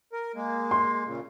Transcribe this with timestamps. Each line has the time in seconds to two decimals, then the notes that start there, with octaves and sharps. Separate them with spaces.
0.13 A#4
0.35 G#3 A#3
0.71 C6
1.07 A#2 C#3